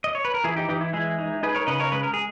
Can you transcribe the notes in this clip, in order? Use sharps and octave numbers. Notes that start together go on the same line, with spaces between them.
D#5
C#5
B4
A#4
E3 E4 G#4
D#4 G4
E3 D#4 G4
E4
G#3 E4 G#4
D#4
D#4 G#4 B4
A#4 C#5
C#3 B4 D#5
A#4 C#5
G#3 B4
A#4
G#4